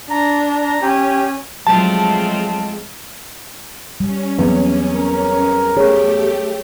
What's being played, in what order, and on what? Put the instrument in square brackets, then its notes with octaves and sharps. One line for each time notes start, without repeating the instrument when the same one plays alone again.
[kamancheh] D4 [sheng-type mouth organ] A#5
[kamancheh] C#4 [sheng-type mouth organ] G4
[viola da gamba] F3 A3 C4 [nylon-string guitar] F#3 [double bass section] G#3 [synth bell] A5
[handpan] G3 [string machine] C#4
[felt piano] E2 [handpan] F#3 C4
[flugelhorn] A#4
[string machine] A3 G4 [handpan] G#4 C#5